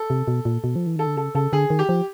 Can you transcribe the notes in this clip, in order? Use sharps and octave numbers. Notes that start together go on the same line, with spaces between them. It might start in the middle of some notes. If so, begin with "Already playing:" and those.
Already playing: A4
C3
B2
A#2
B2
F3
E3
D#3 A4
D3
C#3 A4
C#3 A4
D3 G#4
D#3
G4
F3